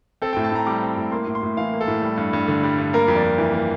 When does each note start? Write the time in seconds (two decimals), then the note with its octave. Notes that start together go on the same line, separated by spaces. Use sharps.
0.22 C4 A4
0.33 G5
0.37 A2
0.44 A5
0.51 A2 A#5
0.67 G3 D6
0.82 C4
0.97 A2
1.12 A#3 C6
1.27 A2
1.35 C6
1.43 A2
1.57 E3 F5
1.73 A#3
1.81 A4
1.88 A2
2.02 G3
2.18 G2
2.33 G2
2.48 D3
2.63 G3
2.78 G2
2.93 A#3 A#4
3.08 F2
3.16 D5
3.24 F2
3.38 E3
3.53 A#3